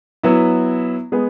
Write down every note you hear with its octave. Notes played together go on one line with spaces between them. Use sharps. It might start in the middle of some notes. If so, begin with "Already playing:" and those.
F#3 B3 E4
G#3 B3 G#4